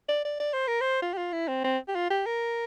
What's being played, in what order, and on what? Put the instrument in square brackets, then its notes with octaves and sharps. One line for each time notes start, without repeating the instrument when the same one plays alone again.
[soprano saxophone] D5
D5
D5
C5
A#4
C5
F4
G4
F4
E4
C4
C4
G4
F4
G4
A#4